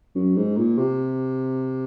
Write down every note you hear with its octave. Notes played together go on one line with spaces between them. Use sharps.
F#2
G#2
A#2
C3